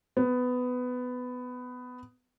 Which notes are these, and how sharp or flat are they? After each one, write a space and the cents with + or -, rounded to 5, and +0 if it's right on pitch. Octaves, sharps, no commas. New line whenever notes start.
B3 +15